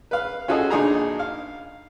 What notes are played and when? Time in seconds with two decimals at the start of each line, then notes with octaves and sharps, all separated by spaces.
0.11 B4 F5
0.48 C#4 F4 F#4 G#4 A4 D#5
0.70 A#1 D4 D#4 G#4 A#5
1.19 F5